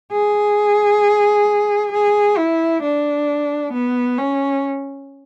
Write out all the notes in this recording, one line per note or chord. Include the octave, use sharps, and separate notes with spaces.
G#4
G#4
E4
D4
B3
C#4